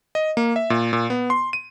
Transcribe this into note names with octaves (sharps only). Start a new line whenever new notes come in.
D#5
A#3
E5
A#2
A#2
B3
C6
D#7